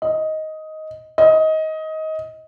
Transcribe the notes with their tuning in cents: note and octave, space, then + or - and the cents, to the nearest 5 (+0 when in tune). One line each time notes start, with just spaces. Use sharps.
D#5 +10
D#5 +20